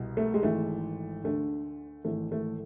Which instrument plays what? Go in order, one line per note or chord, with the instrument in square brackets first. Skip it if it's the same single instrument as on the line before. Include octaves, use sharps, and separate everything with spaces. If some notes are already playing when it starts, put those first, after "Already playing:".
Already playing: [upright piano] C2 B2
A3
G#3
G#1 G#2 E3 A3
D2 D3 A3
G#1 G#2 E3 A3
A3